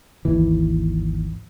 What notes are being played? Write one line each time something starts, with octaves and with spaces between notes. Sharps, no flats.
G#1 D#2 E3